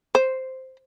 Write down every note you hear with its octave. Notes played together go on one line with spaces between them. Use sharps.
C5